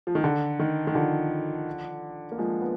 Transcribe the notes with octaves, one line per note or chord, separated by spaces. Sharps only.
F3
D#3
D3
D#3
D#3
D3 F3
A#3
F3 G#3
B3